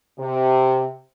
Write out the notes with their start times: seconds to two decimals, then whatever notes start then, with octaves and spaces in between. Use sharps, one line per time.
0.19 C3